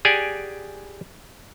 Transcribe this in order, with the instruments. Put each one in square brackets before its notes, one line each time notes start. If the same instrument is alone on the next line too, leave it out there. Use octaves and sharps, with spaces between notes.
[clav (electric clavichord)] G4 G#4 D5 F#5 G#5